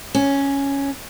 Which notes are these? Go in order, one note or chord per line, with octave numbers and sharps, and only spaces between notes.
C#4